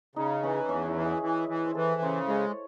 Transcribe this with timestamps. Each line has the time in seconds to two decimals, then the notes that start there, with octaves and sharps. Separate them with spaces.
0.16 C#3 D#4
0.43 E3 C#4
0.69 E2 C#4
0.88 E4
0.96 E3
1.05 G#4
1.22 E3
1.49 E3
1.66 C5
1.75 E3 A4
2.01 C#3 C5
2.28 G#3 C#5